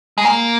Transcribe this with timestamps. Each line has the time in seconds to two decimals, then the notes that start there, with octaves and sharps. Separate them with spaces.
0.18 G#3
0.25 A#3